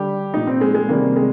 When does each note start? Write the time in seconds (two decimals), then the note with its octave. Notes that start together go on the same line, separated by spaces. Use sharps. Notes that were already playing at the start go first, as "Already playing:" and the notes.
Already playing: D3 G3 G4
0.34 A#2 F3 D#4
0.47 C4
0.61 G#3
0.75 G#3
0.88 C3 D#3 G3 A#3
1.16 G#3